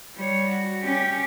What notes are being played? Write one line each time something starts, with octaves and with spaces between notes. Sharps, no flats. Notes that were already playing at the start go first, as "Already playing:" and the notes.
G3 C#5
F#4
C#4 G4